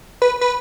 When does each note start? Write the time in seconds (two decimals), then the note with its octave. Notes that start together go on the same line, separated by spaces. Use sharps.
0.22 B4
0.41 B4